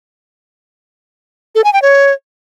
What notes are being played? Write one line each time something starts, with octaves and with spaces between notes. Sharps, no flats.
A4
G#5
G5
C#5